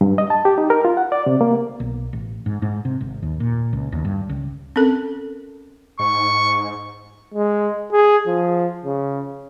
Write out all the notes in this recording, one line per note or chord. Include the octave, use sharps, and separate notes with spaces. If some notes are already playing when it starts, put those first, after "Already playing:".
G2
D#5
A5
G4
D#4
A#4
F4
F#5
D5
C3
A#3
B1
A1
G#2
G#2
C3
G#1
D#2
A#2
C#2
D#2
G2
C#2
C4 C#4 A4 A#4
G#2 C#6
G#3
G#4
F3
C#3